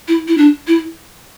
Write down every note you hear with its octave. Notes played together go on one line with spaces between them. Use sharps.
E4
E4
D4
E4